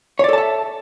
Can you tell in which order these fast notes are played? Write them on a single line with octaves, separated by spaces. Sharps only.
C#5 D5 A4 A5 E5